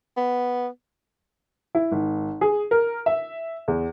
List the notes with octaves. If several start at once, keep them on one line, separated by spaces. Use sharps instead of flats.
B3
E4
G#1
G#4
A#4
E5
E2